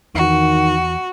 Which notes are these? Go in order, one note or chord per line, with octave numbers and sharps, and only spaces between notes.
E2 D#3 F#4